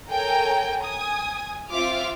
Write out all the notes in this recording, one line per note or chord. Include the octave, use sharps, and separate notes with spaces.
A4 A#4 C#5 G5 G#5 A#5
G#5 D#6 G#6
C4 F4 E5 D6 F6